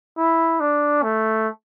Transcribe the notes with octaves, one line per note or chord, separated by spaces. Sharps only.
E4
D4
A3